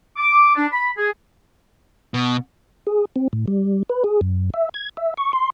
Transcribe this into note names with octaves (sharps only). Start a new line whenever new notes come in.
D6
D4
B5
G#4
B2
G#4
C4
A2
G3
B4
G#4
F#2
E5
G#6
E5
C#6
C6